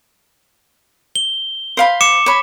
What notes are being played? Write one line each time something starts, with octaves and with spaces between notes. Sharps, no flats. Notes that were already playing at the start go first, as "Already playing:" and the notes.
G7
C5 F5 B5
D6 C#7 E7
C#5 B5